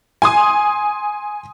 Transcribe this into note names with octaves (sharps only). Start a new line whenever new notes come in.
G#5 C6 D#6